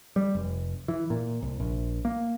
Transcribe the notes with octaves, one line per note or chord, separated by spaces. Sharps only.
G3
F1
E3
A#2
C2
A#1
A#3